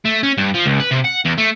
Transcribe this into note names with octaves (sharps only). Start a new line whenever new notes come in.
A3
C#4
G2
F3
C#2
B4
C3
F#5
E2
A3